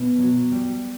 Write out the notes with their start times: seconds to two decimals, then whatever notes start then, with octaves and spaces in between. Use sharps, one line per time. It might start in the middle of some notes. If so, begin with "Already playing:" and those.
Already playing: B2
0.18 F#3
0.51 G3